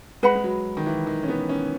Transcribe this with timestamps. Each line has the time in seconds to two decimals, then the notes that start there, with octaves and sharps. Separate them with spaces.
0.23 G#3 B4 F#5 B5
0.35 G#3
0.44 F#3
0.77 D#3
0.86 E3
1.07 D#3
1.23 C#4
1.29 B3
1.49 C#4